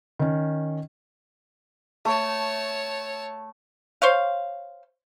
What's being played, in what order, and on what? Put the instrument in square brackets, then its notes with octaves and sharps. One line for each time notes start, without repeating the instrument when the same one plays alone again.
[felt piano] D#3 C#4
[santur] A3 [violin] C#5 A5
[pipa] C5 C#5 F5